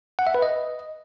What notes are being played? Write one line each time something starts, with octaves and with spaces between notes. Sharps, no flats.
F#5
E5
B4
D#5